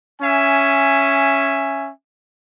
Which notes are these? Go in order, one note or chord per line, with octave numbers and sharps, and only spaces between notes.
C#4 E5 G#5